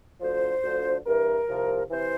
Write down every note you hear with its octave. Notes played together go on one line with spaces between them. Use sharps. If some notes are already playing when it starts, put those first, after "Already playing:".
D2 D3 F3 C5
D2 D3 F3
G2 E3 A#4
C2 C3 F3
C3 E3 C5